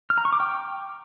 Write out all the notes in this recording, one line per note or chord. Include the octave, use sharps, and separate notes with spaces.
F6
A#5
C#6
D6
G5